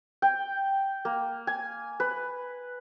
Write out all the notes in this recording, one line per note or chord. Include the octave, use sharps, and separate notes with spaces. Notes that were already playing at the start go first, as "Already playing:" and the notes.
G5
A#3
G#5
B4